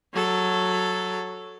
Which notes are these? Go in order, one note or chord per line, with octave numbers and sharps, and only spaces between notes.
F#3 A4